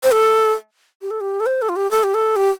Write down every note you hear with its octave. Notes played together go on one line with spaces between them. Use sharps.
C5
A4
G4
A4
G4
A4
C5
A4
F4
G4
A4
G4
A4
G4